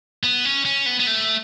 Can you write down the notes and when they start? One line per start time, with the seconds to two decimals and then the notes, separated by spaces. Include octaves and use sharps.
0.24 B3
0.45 C#4
0.65 C#4
0.86 B3
1.00 B3
1.07 A3